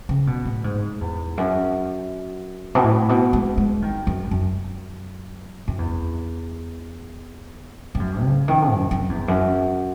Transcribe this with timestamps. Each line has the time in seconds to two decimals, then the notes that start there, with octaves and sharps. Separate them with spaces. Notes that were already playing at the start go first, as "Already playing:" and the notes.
0.09 C#3
0.27 B2
0.45 A2
0.64 G#2
1.01 E2
1.37 F#2
2.75 B2
2.84 A2
3.09 B2
3.33 G#3
3.57 G#3
3.82 D#3
4.07 F#2
4.31 F#2
5.68 F#2
5.79 E2
7.95 G#2
8.00 F#2
8.24 C#3
8.48 D#3
8.72 F#2
8.91 F#2
9.09 E2
9.28 F#2